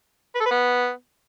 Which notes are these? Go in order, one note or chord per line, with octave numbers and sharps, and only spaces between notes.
B4
A4
B4
B3